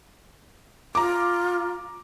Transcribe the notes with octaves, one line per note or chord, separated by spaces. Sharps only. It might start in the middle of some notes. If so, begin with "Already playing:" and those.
F4 A#5 D6